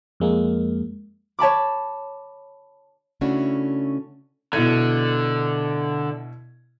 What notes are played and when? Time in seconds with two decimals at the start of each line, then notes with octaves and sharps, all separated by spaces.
0.20 F2 G#3 A#3
1.39 C#5 A5 B5 D6
3.21 C#3 A3 C#4 D4 E4 F#4
4.53 B2 D3 E4 G#6